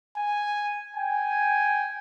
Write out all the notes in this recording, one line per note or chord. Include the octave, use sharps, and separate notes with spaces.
G#5
G5 G#5